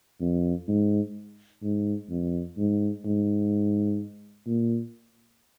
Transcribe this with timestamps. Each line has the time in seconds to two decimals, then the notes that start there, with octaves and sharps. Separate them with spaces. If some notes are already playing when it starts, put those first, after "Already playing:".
0.21 F2
0.68 G#2
1.63 G#2
2.10 F2
2.58 G#2
3.05 G#2
4.47 A#2